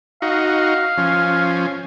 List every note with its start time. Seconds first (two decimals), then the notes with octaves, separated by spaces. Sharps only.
0.22 D#4 F#4 F5
0.98 F3 C#4